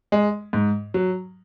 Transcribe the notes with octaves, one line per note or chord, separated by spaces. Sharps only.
G#3
G#2
F#3